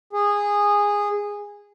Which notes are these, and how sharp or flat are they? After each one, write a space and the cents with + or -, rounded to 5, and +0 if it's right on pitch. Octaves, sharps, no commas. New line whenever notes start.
G#4 -15